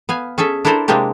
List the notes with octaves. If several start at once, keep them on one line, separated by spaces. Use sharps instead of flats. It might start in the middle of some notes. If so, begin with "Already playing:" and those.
B3 F5 G#5
C#4 G#4 A4 E5
D4 E4 A4 A#4 C5 D5
C3 G#3 A#3 C4 D4 G4